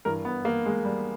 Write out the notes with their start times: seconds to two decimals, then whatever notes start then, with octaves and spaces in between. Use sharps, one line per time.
0.05 G2 E3 A#4
0.25 B3
0.45 A#3
0.66 G#3
0.85 G3